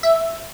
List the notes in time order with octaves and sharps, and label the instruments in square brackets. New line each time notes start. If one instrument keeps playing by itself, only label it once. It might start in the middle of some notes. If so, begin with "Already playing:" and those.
[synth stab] E5